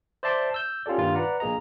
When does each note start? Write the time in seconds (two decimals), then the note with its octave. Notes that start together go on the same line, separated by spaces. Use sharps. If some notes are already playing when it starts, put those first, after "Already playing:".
0.23 C5 D5 E5 A5 C6 D6
0.54 E6 G6
0.86 C#4 F4 G4 A4 D5
0.98 G2 A#2 D#3 G3 F4
1.14 B4 D5 F#5 A#5
1.40 A#1 A#3 G#4 D#5 A#5